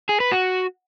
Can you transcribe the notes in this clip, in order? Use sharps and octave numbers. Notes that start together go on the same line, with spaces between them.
G#4
B4
F#4